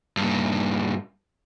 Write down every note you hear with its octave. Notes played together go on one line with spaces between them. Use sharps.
G2 A#2